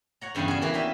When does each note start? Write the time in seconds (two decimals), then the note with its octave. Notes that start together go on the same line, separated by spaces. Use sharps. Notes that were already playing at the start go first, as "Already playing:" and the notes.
0.21 C#5 F#5 A#5
0.35 E2 G2 C#3 C#4 G#4
0.48 D4 F#4 G#4
0.62 E3 A#3 G#4 B4
0.74 C#4 G4 B4 E5